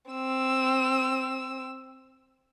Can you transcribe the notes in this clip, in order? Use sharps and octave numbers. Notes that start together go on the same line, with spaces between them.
C4 E6